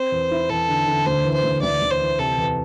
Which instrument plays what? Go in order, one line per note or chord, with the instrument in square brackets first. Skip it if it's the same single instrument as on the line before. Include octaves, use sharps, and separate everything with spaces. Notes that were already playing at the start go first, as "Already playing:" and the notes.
Already playing: [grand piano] C4 [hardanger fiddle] C5
[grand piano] E2
E4
[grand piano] E2 [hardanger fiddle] A4
[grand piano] D3
D3
[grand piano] D2 [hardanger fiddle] C5
[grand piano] E3
[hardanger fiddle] C5
[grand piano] D2
[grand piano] D2 [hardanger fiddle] D5
[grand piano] D2
[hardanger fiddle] C5
[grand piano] E3
[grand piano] C3 [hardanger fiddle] A4
[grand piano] E2